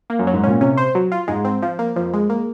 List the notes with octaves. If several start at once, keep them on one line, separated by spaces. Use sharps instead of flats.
A#3
F#2
F#3
G#2
A#2 C#4
C3 C#4
C5
F#3
F4
G#2 G#3
C4
F3
A#3
F2 F3
G#3
A#3